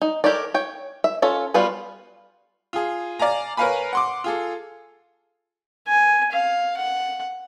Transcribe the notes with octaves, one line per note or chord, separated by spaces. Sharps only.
D#4
G4 A4 A#4 C#5 D5
C#5 G5
E5
C#4 F4 A4 C#5
G3 B3 F4 F#4 B4
F4 G#4
D5 F5 G#5 A#5
A#4 B4 C#5 F5 G#5 B5
F#5 C6 D6
F4 G#4 A4
G#5
F5
F#5